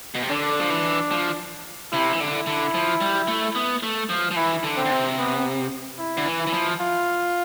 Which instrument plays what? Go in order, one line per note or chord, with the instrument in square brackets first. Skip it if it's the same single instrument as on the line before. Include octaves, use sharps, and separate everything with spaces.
[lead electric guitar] B2
C3
[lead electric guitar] D3 [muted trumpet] D4
[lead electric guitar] F3
E3
F3
[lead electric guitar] C3 [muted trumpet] E4
[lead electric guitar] E3
D3
[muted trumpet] E4
[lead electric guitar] D3
F3
G3
A3
B3
A3
F3
F3
[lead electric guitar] E3 [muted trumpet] E4
[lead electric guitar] D3
[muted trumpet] C4
[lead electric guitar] D3
C3
[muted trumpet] B3
E4
[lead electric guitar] D3
E3
[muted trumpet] E4
[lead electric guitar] E3
F3
[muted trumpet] F4